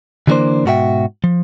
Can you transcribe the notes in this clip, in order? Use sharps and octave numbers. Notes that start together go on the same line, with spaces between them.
D3 E3 G3 A#3 D4 C5
G#2 B2 F#4 A4 E5 G5
F3